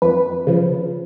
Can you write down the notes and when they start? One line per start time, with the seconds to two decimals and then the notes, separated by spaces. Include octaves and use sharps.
0.02 F2 B4
0.47 C#3 F3